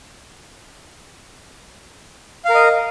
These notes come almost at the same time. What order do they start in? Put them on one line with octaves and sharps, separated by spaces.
F5 A#4 D#5